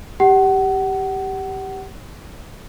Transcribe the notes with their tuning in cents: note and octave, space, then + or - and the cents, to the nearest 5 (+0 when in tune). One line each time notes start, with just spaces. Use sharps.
G4 +0 F#5 +30